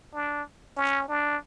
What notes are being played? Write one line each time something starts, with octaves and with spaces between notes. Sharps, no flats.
D4
C#4
D4